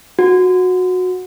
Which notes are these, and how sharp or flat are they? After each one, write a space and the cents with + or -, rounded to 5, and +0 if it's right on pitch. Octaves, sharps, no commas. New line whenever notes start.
F#4 -20